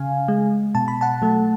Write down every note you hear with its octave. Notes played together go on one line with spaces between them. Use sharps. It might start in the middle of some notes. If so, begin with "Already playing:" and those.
Already playing: C#3 F5 G#5
G#3
B2 A5
B5
F#5 A5
F#3 A3